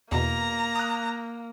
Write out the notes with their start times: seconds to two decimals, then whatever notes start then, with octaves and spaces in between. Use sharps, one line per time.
0.12 E2 B2 A#3 A#5
0.76 D#6 F#6